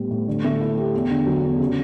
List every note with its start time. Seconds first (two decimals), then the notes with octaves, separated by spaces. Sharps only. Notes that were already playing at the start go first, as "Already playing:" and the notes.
Already playing: A2 G3 B3
0.11 A2
0.28 D3
0.44 A3
0.61 E4
0.78 G4
0.94 E2
1.10 D3
1.26 F#3
1.44 E2
1.60 C#3